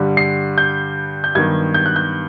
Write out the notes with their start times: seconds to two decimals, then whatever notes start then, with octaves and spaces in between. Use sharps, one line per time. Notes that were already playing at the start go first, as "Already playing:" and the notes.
Already playing: G2 D3 G3
0.17 C7
0.58 G6
1.24 G6
1.35 G2 D#3 F#3 B3 G#6
1.74 G6
1.86 F#6
1.96 G6